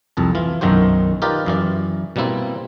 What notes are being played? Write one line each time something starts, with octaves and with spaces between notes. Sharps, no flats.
C2 F2 A5
E3 F4
B1 F#2 D#3 F#3 F#4 C5
D#4 F4 G4 A#4 B4 D5
F#2 E3 D5
B2 G3 A#3 C4 E4